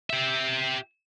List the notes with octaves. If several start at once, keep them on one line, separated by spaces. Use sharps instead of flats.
G4 E5